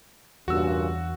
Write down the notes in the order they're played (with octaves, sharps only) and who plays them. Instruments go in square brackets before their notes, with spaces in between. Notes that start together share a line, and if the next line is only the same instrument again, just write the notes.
[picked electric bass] E2 [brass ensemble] G2 A#2 C#3 [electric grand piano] F#4 E6